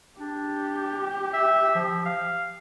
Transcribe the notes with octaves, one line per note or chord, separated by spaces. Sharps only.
D4 G4
E5
F3
F5